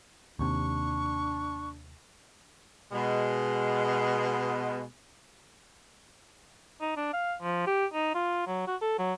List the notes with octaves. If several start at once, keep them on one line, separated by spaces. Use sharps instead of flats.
D#2 C3 D4 C#6
B2 G#3
D#4
D4
F5
F3
G4
D#4
F4
F#3
F#4
A4
F#3